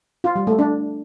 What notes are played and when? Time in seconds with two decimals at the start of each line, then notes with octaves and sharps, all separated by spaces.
0.24 F4
0.36 G3
0.47 A3
0.59 D4